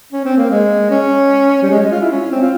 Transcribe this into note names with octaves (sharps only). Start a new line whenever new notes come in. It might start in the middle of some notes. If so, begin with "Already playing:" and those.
C#4
C4
A#3
G#3
C#4
G3
G#3
G#3
F4
E4
C#4
C4
F4